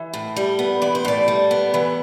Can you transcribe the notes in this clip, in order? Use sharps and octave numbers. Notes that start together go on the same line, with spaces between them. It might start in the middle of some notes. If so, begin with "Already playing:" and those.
Already playing: E3 E5
A2
G3
B3
E3 D5
C5
A2 D5
G3
B3
E3